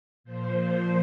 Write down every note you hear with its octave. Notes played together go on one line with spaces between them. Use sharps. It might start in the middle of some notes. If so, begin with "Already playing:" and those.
A#2 F3 C5
C5